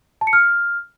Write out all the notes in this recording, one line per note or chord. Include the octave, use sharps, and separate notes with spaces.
A5
C#7
F6